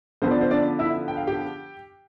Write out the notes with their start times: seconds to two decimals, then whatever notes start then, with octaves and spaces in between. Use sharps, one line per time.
0.22 D3 F3 B3 C5
0.31 D5
0.41 C5
0.51 D4 D5
0.79 E4 E5
1.08 G5
1.17 F5
1.27 G4 G5